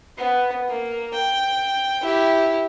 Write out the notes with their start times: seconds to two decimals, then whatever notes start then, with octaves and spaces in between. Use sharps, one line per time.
0.17 B3
0.68 A#3
1.14 G5
2.02 E4 G4